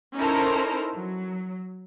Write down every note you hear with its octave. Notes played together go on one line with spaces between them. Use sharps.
C#4 D#4 E4 A4 A#4 C5
F#3